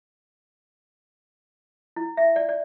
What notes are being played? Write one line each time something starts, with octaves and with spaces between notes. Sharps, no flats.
E4
E5
D5
D5